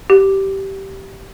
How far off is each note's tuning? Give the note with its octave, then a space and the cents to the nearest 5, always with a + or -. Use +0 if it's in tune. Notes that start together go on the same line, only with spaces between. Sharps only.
G4 -15